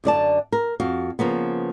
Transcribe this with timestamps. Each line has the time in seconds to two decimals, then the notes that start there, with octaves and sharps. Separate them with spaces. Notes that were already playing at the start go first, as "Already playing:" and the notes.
0.04 F#2 D3 D5 A5
0.52 A#4
0.80 F2 F#4 F5
1.19 C#3 F3 A#3 B3